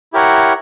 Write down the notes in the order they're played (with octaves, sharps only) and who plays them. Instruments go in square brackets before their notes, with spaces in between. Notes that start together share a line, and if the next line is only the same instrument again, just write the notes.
[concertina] E4 G4 A#4 C#5 F#5